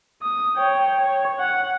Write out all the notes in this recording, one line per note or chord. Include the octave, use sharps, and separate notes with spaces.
D#6
C#5 G5
C#5
F#5